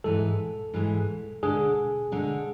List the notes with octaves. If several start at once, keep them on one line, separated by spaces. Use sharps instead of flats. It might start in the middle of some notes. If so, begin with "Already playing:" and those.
G#2 E3 G#3 A4
G#2 E3 G#3
D3 G#3 D4 G#4
D3 G#3 D4